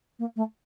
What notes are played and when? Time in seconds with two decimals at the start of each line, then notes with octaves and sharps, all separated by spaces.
0.19 A#3
0.36 A3